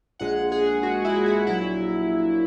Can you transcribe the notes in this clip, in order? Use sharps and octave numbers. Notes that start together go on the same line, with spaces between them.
A#1 A#2 G#3 F#5
G#4
F#4
E4
F#4
A#1 A#2 F#3 E4